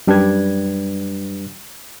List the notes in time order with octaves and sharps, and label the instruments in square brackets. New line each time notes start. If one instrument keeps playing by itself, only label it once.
[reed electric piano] F#2 G3 D4 G4 B4 G#6